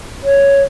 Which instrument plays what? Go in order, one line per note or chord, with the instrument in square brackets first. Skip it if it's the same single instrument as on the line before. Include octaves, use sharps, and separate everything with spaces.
[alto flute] C#5